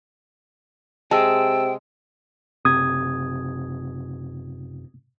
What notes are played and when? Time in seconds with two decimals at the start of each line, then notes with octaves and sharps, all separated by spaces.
1.11 C3 G#3 G5 A5 E6
2.65 F#1 C3 D#6 G#6